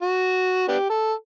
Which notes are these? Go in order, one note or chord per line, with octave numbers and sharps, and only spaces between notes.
F#4
B3 D4 G4
A4